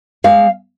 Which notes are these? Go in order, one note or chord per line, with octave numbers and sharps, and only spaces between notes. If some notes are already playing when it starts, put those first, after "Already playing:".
G#3 F5